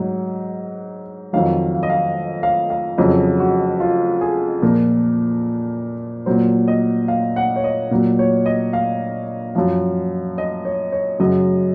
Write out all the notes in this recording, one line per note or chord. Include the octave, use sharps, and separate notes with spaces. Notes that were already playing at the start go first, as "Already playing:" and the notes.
Already playing: G#2 F#3
F2 D#3 F#3 F5
F5
D#5
F5
F5
F5
F2 C#3 F#3 D#5
F#4
F4
G#4
A#2 F3 A#4
A#2 F#3 C5
D#5
F5
F#5
C#5
D#5
A#2 F#3
C#5
D#5
F5
F#2 F3 F5
D#5
C#5
C#5
F#2 C#3 F#3 D#5